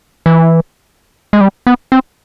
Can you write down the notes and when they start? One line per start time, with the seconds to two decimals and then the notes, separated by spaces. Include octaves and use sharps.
0.26 E3
1.33 G#3
1.41 G3
1.67 B3
1.92 C4